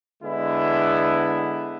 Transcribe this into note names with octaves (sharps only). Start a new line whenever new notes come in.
D3 G#3 B3 E4